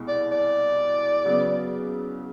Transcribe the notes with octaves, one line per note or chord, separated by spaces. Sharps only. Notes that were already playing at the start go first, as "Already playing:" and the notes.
Already playing: C2 B2 G#3
D5
D5
C#3 F#3 B3